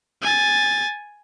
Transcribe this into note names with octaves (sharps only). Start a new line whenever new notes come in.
G#5 A6